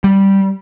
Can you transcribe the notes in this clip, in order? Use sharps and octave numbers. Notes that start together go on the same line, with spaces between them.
G3